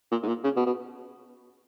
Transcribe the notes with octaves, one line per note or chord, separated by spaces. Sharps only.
A#2
G#2
A#2
C#3
B2
B2